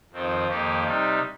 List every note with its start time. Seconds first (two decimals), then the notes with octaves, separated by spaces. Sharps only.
0.12 F2 D#3 C4 F4
0.48 F2 D#3 A#3 D#4 G4
0.84 C3 G3 D#4